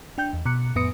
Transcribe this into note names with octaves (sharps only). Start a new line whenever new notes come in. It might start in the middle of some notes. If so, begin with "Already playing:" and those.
D4 G5 G6
E2
B2 F#6 C#7
F2 A2 B3 B4 D#6 C#7